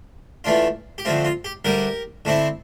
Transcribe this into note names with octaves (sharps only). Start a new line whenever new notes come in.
E2 E3 A3 D4 F4
G4
F2 D3 A3 C4 F4
F4
G4
D2 D3 G3 G4 A#4
D3 A3 C4 E4